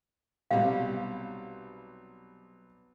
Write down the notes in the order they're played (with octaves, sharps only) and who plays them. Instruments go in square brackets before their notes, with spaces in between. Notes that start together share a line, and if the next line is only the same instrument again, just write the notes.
[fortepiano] B1 C3 G3 [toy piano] F5